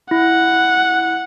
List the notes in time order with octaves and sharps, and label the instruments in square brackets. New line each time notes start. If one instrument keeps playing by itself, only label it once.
[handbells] E4 [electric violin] F#5